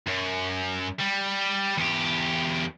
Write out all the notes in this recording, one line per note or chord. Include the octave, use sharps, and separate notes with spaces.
F#2
G3
E2 G4